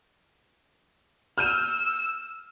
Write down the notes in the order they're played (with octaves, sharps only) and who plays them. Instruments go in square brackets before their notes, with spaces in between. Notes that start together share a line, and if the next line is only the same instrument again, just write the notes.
[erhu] E6 [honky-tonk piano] F6 G6 D#7